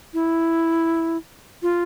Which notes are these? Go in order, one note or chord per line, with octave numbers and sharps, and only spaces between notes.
E4
F4